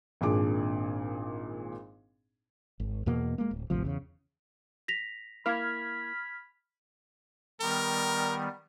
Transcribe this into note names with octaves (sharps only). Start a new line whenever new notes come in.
G#1 A#2 D4 G#4 D6
G#1
E2 B2 A#3
G#3 A#3
D1
G#1 D2 C3 F3
E2 C#3
A#6 B6 F7
A#3 E4 F5 B5 F6 G#6
D#3 G3 B3 A#4